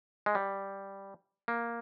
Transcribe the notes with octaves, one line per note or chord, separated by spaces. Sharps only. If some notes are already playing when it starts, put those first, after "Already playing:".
G#3
G3
A#3